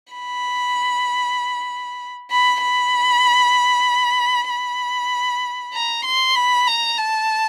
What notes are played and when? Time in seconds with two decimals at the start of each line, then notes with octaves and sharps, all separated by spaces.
0.13 B5
2.31 B5
2.62 B5
4.49 B5
5.74 A#5
6.05 C6
6.36 B5
6.67 A#5
6.98 A5